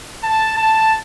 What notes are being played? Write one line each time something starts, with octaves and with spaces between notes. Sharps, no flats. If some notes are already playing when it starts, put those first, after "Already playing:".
A5
A5